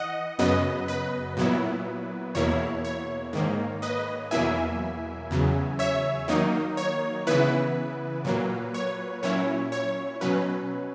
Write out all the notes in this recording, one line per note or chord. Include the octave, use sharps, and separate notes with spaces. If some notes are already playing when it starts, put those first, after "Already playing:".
Already playing: E3 D#5 F#5
F#2 C#3 F#3 B3 B4 D#5
B4
A#2 F#3 B3 E4
E2 B2 A#3 E4 C#5
C#5
G#2 D#3 A#3
B4 D#5
E2 B2 F#3 A#3 E4 E5 G#5
E2 C#3 F#3
C#5 E5
D#3 F#3 A#3 D#4
C#5
C#3 E3 B3 E4 B4
A#2 F#3 A#3
C#5
A#2 F#3 C#4 E4 C#5
C#5
B2 F#3 C#4 B4